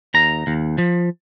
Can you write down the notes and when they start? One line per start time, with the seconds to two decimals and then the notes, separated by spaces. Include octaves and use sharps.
0.14 D#2 A#5
0.47 D#2
0.78 F3